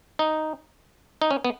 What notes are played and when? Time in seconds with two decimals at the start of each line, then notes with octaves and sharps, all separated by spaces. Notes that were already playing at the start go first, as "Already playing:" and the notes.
0.19 D#4
1.22 D#4
1.31 C#4
1.45 B3